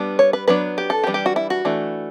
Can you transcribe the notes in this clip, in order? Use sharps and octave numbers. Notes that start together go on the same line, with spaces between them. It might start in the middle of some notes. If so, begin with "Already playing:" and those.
Already playing: G3 B3 D4
C#5
B4
F#3 B3 D4 B4
G4
A4
G4
E3 G3 D4
G4
F#4
E4
F#4
E3 A3 D4